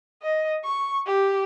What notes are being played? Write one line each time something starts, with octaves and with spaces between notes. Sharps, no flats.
D#5
C#6
G4